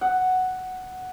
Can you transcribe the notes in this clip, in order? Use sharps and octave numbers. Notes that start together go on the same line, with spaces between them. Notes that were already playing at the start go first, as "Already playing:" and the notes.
F#5